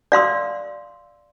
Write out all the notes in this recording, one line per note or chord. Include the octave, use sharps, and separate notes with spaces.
D5 F5 C6 E6